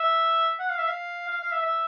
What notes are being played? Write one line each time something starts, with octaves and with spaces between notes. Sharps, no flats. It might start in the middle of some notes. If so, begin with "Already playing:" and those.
Already playing: E5
F#5
F5
E5
F5
F5
F5
E5
E5